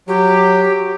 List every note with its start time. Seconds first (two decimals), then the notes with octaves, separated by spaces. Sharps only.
0.08 F#3 G4